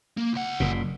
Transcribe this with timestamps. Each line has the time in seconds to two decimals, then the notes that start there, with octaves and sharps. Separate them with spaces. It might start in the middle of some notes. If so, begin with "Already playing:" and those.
0.17 A#3
0.33 C#2 F#5
0.60 F#1 A#2